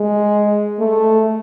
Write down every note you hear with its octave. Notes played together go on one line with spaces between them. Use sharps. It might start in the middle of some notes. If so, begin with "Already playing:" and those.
Already playing: G#3
A3